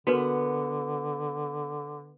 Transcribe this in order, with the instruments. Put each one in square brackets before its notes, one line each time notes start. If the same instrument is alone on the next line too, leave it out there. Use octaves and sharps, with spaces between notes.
[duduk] D3 [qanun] B3 [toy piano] F#4 A#4 B4